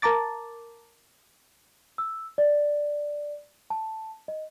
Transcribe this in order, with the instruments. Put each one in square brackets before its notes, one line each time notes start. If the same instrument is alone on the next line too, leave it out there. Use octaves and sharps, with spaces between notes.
[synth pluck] A#4 A5 A#5 D6 A6
[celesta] E6
D5
A5
D#5